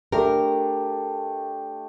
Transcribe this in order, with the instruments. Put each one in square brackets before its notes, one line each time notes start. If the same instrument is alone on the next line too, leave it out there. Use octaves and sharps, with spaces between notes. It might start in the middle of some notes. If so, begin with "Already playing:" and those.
[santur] A3 D4 G4 [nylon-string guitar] A#4